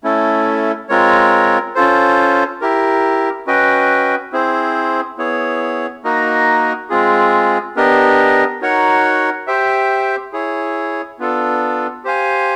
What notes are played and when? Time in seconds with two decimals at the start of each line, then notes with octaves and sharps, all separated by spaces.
0.04 A3 C#4 E4 A4
0.89 G#3 C4 F4 A#4 C#5
1.75 C#4 F4 A4 C5
2.61 E4 G4 A#4
3.47 C#4 F#4 B4 D#5 G5
4.32 C4 E4 G#4 C5
5.18 B3 E4 G#4 C#5
6.04 A#3 D#4 F#4 A#4 D#5
6.89 G#3 C4 F4 G#4
7.76 B3 D4 G4 A#4 D#5
8.62 D#4 F#4 A#4 C#5 F#5
9.47 G4 C5 E5 G5
10.33 E4 G#4 C#5
11.19 B3 D4 F4 A4
12.04 G4 C5 F5 G#5